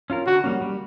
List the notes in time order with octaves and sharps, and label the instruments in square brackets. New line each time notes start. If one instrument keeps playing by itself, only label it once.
[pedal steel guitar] C#4 F4 A#4
[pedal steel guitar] D3 [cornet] F#4
[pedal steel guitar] G3 A#3 C#4
G3